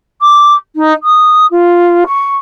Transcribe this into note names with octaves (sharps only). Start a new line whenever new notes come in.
D6
D#4
D#6
F4
C#6